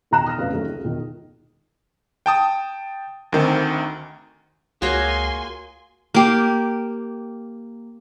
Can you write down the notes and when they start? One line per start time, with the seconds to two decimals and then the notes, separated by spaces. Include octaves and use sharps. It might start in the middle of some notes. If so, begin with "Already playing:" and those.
0.11 E1 D#3 G5 A#5 F#6 E7
0.26 D#6 F6 A#6
0.38 F1 F#2 D#4 F#4 B4 F5
0.53 F#2 D#3 F#3 A3 C#4
0.67 C#2
0.84 E1 D#3
2.26 G5 A5 D#6
3.32 D2 D#3 C4
4.82 C#2 A#3 F4 F#4 G#4 C#5 G#5 C6
6.14 A#3 G4